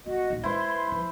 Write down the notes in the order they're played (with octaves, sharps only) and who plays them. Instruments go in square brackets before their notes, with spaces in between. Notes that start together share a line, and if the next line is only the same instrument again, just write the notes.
[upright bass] G1 B3 [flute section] F#4 D#5
[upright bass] A#1 D#2
[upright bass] G#3 [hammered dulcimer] E4 C5 [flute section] B4 C6
[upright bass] F3